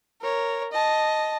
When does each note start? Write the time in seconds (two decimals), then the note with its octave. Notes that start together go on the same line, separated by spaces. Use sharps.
0.22 A#4 C#5
0.72 D#5 A5